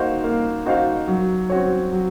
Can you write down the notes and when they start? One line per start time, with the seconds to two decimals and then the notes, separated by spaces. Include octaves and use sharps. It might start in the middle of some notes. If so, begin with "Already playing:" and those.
Already playing: A#3 D#4 F#4 C5 F5
0.24 A#3
0.66 D#4 F#4 C5 F5
1.08 F#3
1.50 C4 F#4 C#5
1.93 F#3